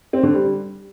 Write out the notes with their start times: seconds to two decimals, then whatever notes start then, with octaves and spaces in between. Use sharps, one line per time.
0.13 C4
0.23 D3
0.33 G3